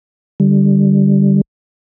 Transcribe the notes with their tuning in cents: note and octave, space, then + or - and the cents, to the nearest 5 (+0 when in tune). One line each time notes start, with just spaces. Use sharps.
D3 +0 G3 +0